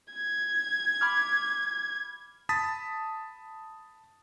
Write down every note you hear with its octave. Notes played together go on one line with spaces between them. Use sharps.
G#6
B5 D6 F6
A5 B5 D#6 A6 B6